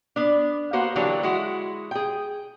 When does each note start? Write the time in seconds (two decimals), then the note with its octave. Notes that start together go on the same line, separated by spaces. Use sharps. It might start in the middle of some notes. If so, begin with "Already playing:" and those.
0.16 B3 D4
0.73 A#3 B3 F#4 C5 F#5
0.96 D3 E3 F#3 A#3 D4 G4
1.23 G#3 E4 F#4
1.91 G#4 G5